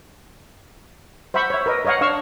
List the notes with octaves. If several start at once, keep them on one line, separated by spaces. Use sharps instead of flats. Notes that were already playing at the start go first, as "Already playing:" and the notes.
C5 E5 F#5 B5 C#6
C#5 E5
A#4 B4 D#5
A#4 C#5 D#5 F5 F#5
D4 C#5 F5 C#6 E6